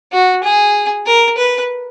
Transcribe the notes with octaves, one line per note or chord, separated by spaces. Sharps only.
F#4
G#4
A#4
B4